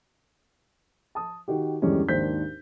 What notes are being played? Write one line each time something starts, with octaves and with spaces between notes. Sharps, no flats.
A5 D#6
D#3 F#4 G4
E2 G2 D3 G3 G#3 C#4
G#1 D#2 D4 C5 G6 B6